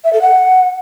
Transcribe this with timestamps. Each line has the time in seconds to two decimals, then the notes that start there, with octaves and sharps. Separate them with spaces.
0.04 E5
0.13 A4
0.21 F#5